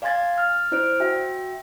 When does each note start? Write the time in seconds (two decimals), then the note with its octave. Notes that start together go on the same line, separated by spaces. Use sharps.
0.02 D5 F5 G#5 C6 G#6 A6
0.34 F6 A6
0.72 E4 C5 D5 F6 D7
1.00 F#4 E5 G5